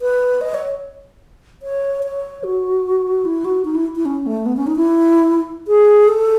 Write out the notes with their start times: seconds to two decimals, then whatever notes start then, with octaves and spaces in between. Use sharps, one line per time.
0.01 B4
0.41 D#5
0.54 C#5
1.63 C#5
2.04 C#5
2.44 F#4
3.25 E4
3.45 F#4
3.65 D#4
3.75 E4
3.96 E4
4.05 C#4
4.26 A3
4.46 B3
4.57 C#4
4.67 D#4
4.76 E4
5.68 G#4
6.08 A4